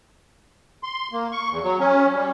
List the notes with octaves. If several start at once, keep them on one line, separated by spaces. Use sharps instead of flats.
C6
A#3
C#6
E2
F#3
C#4
G3